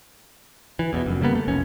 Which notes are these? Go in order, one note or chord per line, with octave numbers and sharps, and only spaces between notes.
E3
E2 G2 B2
F1 F#2
C#3 G3 A#3 B3
A3
F1 B1 C#4